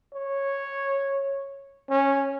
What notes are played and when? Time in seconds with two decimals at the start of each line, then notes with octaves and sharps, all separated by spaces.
0.13 C#5
1.90 C#4